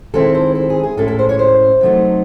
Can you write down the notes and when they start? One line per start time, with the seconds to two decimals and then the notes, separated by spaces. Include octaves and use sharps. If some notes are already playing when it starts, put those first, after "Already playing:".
0.14 D#3 G#3 C4 E4 A4
0.35 C5
0.55 A4
0.70 G#4
0.83 G#4
0.97 A2 G#3 C#4 E4 A4
1.08 A4
1.19 C5
1.29 C#5
1.39 C5
1.81 C3 F#3 A3 D#4